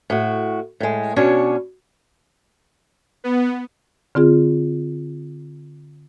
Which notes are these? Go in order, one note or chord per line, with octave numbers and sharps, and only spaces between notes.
A2 F#4
A2 G#3
B2 C#4 D4 C#5
B3
D3 C4 F4 G#4